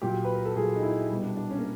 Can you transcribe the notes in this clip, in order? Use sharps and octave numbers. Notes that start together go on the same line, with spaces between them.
A#2 F#3 G4
B4
A#4
A4
A#2 F#3 G#4
D#4
E4
B2 G3
D4
D4
C#4
A#3